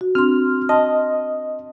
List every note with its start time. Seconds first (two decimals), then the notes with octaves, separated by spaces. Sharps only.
0.01 F#4
0.15 C4 D4 C6 F6
0.69 D#5 A5 C6 F6